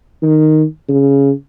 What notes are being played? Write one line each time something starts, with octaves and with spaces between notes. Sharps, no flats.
D#3
C#3